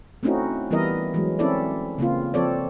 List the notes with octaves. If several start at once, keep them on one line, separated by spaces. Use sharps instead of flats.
A3 C4 C#4 D#4 E4 F#4
E3 G3 B3 E4 A#4 D#5
E3 F#3 G#3
C4 C#4 E4 A4 D5
C#3 A#3 C4 F4
F3 C4 A4 C#5 D5